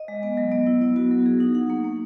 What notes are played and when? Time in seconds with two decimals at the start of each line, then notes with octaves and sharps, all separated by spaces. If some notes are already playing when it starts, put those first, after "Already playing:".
Already playing: D#5
0.08 G#3
0.23 B3
0.37 F#3
0.52 B3
0.67 E4
0.81 B3
0.96 F#4
1.11 F#3
1.26 G#4
1.40 D#4
1.55 F#5
1.70 A#3
1.85 A#3